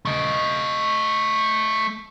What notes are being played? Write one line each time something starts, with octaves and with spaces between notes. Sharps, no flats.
A3 D#5